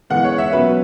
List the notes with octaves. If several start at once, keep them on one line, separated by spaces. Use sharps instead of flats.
E3 G#3 B3 F#5
C#5
E5
B2 F#3 C#4 B4